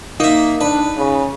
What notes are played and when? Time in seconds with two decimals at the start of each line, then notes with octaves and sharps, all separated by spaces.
0.20 A#3 D#4 E5
0.61 D4 B4
0.97 C#3